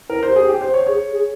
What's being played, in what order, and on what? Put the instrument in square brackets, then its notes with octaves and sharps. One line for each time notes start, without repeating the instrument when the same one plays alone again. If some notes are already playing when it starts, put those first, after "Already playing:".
[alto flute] E4 [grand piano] A#4
[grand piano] C5
[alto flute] G4
[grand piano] G#4
G4
C5
C#5
[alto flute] G#4 [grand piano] C#5
[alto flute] G#4